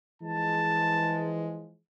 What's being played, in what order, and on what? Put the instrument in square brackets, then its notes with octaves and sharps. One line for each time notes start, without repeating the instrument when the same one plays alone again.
[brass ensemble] E3 F3 G#3 [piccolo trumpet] A5